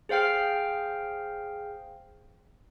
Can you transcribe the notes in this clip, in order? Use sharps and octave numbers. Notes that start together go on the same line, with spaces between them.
G#4 C5 F5 G5 F6